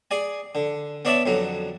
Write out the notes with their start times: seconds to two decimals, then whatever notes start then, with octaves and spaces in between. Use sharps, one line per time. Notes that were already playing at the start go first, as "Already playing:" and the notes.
0.11 G#4 D5 G#5
0.55 D3
1.05 B3 D4 C#5 D5 E5 A5
1.26 F2 D3 F#3